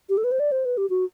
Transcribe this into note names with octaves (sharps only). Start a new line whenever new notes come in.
G4
A4
B4
C5
D5
C5
B4
G4
F#4